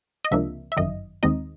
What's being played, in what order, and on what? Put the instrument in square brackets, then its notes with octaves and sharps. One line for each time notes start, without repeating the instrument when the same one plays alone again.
[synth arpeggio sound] D#5
C#2 C3 F3 A#3 D4 E5
E5
G1 F#2 D#3 D#5
D#2 D#3 G#3 C4 D#4 D#5